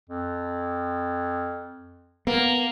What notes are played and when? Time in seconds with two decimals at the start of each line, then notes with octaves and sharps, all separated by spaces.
0.10 F2
2.27 A#3 B3